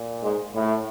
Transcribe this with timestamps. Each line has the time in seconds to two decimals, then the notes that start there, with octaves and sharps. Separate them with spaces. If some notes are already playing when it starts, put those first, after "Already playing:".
Already playing: A#2
0.23 G#2 G#3
0.54 A2 A3